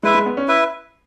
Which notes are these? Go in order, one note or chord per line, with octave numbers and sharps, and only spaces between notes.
G#3 E4 B4 E5
G#3
B3
C#4
E4 B4 E5